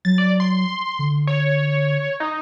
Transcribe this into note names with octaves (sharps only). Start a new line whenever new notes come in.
F#3 A6
D5
C6
D3
C#5
D#4